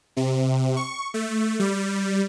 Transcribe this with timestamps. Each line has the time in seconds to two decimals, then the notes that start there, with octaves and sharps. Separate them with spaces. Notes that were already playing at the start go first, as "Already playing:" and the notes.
0.17 C3
0.77 C#6
1.14 A3
1.59 G3